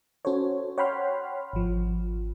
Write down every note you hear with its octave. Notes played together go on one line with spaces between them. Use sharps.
C#4 F#4 A4 C5 C#5
C#5 F#5 G5 B5 C6 F6
G#1 F3